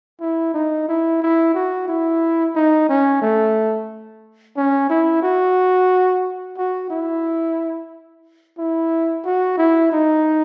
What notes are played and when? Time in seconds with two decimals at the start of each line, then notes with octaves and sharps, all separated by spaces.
0.21 E4
0.54 D#4
0.88 E4
1.22 E4
1.54 F#4
1.88 E4
2.55 D#4
2.89 C#4
3.22 A3
4.56 C#4
4.89 E4
5.22 F#4
6.57 F#4
6.90 E4
8.58 E4
9.25 F#4
9.57 E4
9.92 D#4